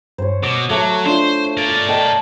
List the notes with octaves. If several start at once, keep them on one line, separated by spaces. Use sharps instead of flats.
G2 C5 C#5
B2 D6 A#6
F#3 A3 C#5
D4 E4 F4 C5
A#4 D5
A4 D#5 G5 A5